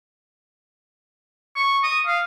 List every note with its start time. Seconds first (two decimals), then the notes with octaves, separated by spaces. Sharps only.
1.56 C#6
1.83 D#6
2.07 F5